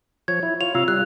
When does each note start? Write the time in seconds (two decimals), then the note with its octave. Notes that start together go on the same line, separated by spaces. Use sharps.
0.28 F3 C#5 G#6
0.43 E4
0.61 F4 C#5 F7
0.75 C3 F4 C#5 F5 E6
0.88 G3 F#6